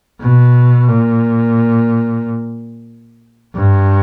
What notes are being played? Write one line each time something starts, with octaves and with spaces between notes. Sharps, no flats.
B2
A#2
G2